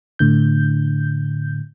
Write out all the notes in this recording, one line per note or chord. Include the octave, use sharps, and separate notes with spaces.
A2 D3 G6